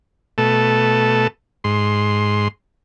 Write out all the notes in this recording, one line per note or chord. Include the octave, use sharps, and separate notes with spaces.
B2 A3 A4
G#2 C6